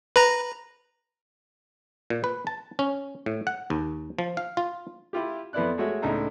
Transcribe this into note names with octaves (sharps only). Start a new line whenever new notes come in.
B4 A#5
A#2
B4
A5
C#4
A2
F#5
D#2
F3
F5
F4
E4 F4 G4
F2 B3 E4 D5 F#6
G#3 A3 F#4 C#5 E5
C#2 A2 D4 D#4 A4 A#5